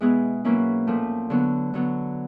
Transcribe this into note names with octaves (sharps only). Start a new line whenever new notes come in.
B2 G#3 B3 E4 G#4
B2 F#3 A#3 C#4 E4
A#2 F3 A3
D3 F#3 B3
D3 F#3 B3